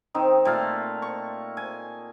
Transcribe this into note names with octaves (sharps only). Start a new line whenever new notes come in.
D#3 C4 D#4
A#2 A3 F5
C#6
G#5